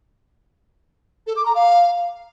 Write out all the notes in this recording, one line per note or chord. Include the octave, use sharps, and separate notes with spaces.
A4
D6
A#5
F5